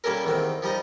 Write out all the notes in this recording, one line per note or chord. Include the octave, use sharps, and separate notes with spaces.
G3 A#3 C#4 A4 A#4
E2 D#3 C4
F3 G3 D#4 D#5